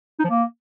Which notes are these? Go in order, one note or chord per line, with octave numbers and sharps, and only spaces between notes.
D#4
F3
A#3